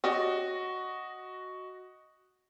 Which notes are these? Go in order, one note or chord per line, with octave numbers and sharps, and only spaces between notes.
C#4 F#4 G4 D5 D#5